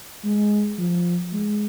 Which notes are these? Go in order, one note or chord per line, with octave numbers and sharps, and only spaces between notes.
G#3
F3
G#3